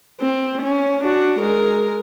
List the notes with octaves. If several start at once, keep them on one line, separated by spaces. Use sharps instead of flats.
C4
C#4
D4 F#4
G#3 A#4